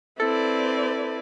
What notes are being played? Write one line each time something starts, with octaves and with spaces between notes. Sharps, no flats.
C4 E4 A4 B4 D5